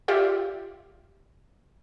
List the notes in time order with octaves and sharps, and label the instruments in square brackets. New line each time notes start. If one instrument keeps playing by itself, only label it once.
[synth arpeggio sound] F4 G4 D5 E5 F5